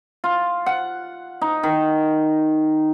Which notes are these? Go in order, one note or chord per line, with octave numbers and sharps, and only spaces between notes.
F4
F#5
D#4
D#3